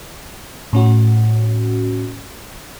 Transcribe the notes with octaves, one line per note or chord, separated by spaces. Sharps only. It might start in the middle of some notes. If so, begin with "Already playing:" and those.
A2 C#4 F#4